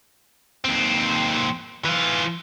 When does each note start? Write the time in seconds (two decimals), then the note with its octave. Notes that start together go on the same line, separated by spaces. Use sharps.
0.64 D#2 C4
1.85 E3 F4